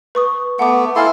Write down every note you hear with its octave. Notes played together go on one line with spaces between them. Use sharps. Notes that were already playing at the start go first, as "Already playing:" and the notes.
B4 C#6 D#6
A3 B3 F#5 D6
E4 A4 F5 G#5 C6 F6